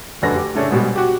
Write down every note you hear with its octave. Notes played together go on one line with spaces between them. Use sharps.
F1 F#2 D3 B4 A#6
G4
A2 C#3 A3 C#4 D4
G#2 B2 G3
F#4 G4